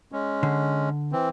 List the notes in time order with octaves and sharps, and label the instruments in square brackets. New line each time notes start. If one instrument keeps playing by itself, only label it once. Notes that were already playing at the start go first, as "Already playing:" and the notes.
[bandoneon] G#3 C#4
[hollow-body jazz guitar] D3
[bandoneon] E3 C4